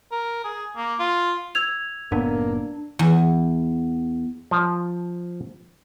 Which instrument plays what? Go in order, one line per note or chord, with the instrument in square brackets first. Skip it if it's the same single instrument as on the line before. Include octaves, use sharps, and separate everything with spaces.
[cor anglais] A#4
G#4
A#3
F4
[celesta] E6 G#6 F7
[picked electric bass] F#1 A2 B3 [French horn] A#3 [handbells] D4
[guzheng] E2
[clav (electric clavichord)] F3